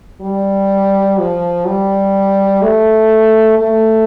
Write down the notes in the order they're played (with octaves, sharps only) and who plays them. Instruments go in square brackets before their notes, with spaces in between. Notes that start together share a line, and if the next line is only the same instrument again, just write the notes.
[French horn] G3
F3
G3
A3
A3